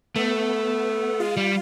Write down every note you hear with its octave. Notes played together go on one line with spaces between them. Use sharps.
A3 B3
G#3 F4
G3